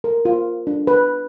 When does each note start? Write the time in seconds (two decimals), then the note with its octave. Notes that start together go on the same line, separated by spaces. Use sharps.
0.04 A#4
0.25 F4
0.67 D4
0.87 B4